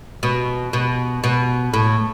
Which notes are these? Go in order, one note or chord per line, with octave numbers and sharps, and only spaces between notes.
B2
B2
B2
A2